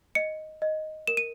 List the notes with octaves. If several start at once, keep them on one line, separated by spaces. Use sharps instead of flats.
D#5 C#7
D#5
A#4 E7
D#7